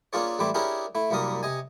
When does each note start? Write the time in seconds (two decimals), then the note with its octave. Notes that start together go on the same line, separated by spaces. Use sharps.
0.13 A#3 C#4 D4 F4 G#4 C#5
0.39 A1 G3 A3 C4 E4 D6
0.54 C#4 D4 E4 G4 G#4 A#4
0.95 A3 E4
1.11 C2 F#2 G3 A#3 A#4 D#6
1.43 C3 D#5 G#5